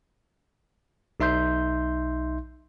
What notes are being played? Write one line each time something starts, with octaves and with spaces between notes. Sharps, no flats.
B1 D#4 E5 C6 G6